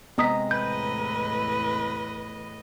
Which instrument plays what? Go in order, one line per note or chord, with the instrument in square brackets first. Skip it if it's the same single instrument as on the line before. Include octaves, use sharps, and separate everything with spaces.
[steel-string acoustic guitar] C3 G#3 A#5 [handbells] B3 D#6 B6
[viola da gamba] E2 A2 D#5 [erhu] B4 [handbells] G6